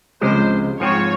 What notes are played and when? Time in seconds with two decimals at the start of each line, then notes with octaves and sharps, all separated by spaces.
0.21 C#2 C3 F3 G#3 C5
0.80 G#2 F3 C4 C#5